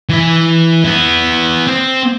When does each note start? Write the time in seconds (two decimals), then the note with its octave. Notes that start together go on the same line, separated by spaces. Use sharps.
0.09 E3 E5
0.84 B3 E4
1.67 C4